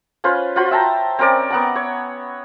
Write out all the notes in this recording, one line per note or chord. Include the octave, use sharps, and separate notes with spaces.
C#4 F4 B4 C5
F4 F#4 C5 B5
E5 G5 A5 A#5
C4 C#4 A#4 D5
B3 F#5 A#5
C#5